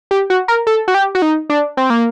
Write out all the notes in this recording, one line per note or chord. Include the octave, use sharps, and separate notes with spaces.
G4
F#4
A#4
A4
F#4
G4
F#4
D#4
D4
C4
A#3